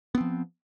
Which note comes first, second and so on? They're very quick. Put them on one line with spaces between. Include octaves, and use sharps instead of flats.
B3 C4 F3